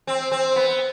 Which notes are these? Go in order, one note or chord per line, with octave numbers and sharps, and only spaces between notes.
C4
C4
B3